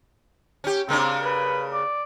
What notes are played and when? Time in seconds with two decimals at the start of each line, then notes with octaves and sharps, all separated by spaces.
0.64 C#4 G4
0.89 C#3 A#3 C4 D4
1.24 B4
1.73 D5